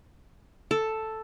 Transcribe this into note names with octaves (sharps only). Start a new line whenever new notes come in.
A4